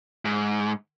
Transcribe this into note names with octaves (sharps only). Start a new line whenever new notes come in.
G#2